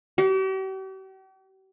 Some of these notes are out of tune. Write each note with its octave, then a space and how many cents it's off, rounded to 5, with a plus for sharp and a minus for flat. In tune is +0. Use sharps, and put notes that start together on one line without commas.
G4 -45